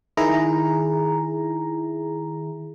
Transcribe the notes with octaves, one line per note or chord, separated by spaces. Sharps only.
D#3 E4 G#4 A#5